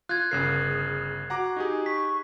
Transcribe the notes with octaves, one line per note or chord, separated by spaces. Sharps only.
F4 F#6 G#6
G1 C#3 G#4 A#4 C7
F#4 F#5 A#5 D6
D#4 G4 G#4
C#6 B6